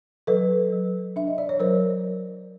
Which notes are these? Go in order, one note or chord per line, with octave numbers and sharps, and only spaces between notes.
F#3 A4 B4
F#3
D4 E5
D#5
D5
C#5
F#3 A#4 C5